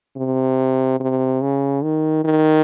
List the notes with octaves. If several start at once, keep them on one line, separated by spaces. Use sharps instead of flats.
C3
C3
C#3
D#3
D#3